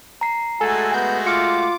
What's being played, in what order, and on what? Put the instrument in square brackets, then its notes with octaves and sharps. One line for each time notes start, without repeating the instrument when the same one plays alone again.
[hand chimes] A#5 C7
[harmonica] G#3 A3 F#4 [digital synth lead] A4 [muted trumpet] G#5
[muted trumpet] B3 [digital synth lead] G6
[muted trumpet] F4 [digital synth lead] D6 [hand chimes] F6 C#7